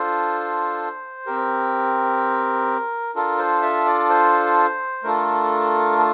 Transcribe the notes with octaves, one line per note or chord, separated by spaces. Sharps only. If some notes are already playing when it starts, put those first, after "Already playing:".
Already playing: D4 F4 A4 C5
C4 G4 A#4
D4 F4 A4 A#4
C5
E5
D5
C5
A3 D4 F4 A4 A#4
A4